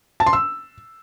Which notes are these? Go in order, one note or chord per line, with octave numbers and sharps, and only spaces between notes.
A5
C6
E6